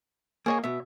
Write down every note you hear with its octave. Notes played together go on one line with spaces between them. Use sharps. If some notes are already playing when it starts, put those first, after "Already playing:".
A#3 G#4 C#5 D#5 G#5
B2 B3 E5